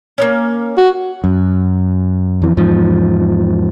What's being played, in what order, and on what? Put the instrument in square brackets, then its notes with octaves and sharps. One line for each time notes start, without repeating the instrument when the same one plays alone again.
[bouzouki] A#3 B3 C#4
[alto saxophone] F#4
[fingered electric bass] F#2
F2 E3
E2 G#2 F3